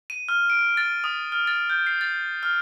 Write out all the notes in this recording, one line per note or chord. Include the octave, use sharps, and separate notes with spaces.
D#7
F6
D7
A6
D#6
F6
A6
G6
C7
A6
F6